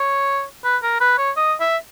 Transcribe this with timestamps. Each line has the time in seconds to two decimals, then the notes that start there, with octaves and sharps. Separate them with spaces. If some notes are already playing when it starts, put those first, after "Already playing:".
Already playing: C#5
0.64 B4
0.83 A#4
1.01 B4
1.18 C#5
1.37 D#5
1.60 E5